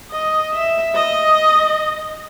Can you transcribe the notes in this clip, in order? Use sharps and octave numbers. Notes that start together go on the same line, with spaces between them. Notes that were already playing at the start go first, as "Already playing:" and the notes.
D#5
E5
D#5